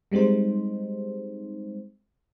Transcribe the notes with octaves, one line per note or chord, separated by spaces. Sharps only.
G3 G#3 C4 D#4 C5